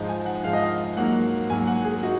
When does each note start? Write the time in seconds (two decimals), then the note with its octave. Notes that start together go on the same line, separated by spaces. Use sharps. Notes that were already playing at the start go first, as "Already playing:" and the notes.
Already playing: G#2 F3 G#3 D#4
0.09 G#5
0.26 F#5
0.44 G#2 F3 G#3 D#4 F5
0.53 D#5
0.64 F5
0.97 G#2 F#3 A#3 F#5
1.50 G#2 F#3 A#3 G#5
1.67 F#5
1.85 G#4
2.03 D#4 F#4